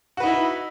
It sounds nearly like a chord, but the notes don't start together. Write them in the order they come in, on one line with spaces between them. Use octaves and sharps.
F#4 B4 D#4 E4